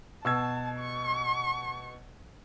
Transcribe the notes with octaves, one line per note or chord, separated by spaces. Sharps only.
B2 A5 E6 G#6
C#6